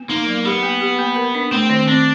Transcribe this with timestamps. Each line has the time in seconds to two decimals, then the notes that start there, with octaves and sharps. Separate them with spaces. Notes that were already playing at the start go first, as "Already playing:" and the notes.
Already playing: B3
0.09 A#3 D#4
0.27 F#3
0.45 B3 G4
0.63 A#3
0.81 G4
0.99 A#3
1.16 A#4
1.35 D4
1.51 A3 C4
1.70 D#3
1.87 C4 D4